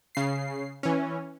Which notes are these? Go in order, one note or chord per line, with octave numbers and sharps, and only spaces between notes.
C#3 C7
E3 C#4